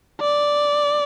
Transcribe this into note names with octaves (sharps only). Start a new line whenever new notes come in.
D5